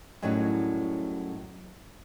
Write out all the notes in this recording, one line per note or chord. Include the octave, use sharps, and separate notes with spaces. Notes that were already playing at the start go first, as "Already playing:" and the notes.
F#2 A2 F#3 G3 C#4 D#4